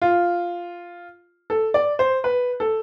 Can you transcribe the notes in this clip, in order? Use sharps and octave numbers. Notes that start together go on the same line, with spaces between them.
F4
A4
D5
C5
B4
A4